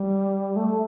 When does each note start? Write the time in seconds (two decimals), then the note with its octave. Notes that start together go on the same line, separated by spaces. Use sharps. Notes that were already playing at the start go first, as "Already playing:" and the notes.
Already playing: G3
0.56 A3